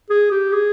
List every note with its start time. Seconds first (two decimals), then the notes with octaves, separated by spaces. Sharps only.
0.10 G#4
0.31 G4
0.52 G#4